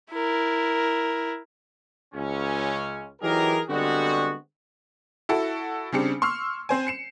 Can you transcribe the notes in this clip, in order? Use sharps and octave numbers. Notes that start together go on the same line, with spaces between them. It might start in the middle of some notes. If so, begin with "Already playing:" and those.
E4 A#4
C#2 C#3 C#4
E3 F#3 D#4 G4 G#4 A#4
D3 G3 G#3 B3 C4 F#4
E4 F#4 A4
C#3 G3 C4 D4 C#7
C6 C#6 E6 F6 C7
C4 C5 G#5
C7 C#7 E7